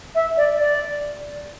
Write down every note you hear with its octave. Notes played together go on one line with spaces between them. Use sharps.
E5
D5
D5